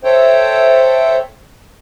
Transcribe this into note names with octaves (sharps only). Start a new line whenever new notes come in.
A4 C5 C#5 E5 G5